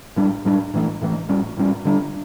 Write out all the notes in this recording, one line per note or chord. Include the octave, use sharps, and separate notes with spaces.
A2 G3 D4
A2 G3 D4
A2 E3 A3
A2 E3 A3
A2 G3 C#4
A2 G3 C#4
D3 G3 D4